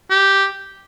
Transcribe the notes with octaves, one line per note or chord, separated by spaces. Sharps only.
G4